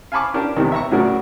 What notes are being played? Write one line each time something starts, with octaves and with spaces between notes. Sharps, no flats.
F5 G#5 A5 B5 C#6 D6
C#4 D4 G4 A#4
E2 C3 D#3
E5 A#5 C#6
A2 C#3 F#3 F#4 A#4 D5